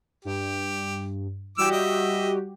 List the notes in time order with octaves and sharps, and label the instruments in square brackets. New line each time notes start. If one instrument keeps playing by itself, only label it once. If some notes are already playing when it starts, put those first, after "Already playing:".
[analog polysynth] G2 [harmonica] G4
[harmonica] E3 D6 E6 [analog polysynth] G3 F#4 G4
[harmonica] D#5 E5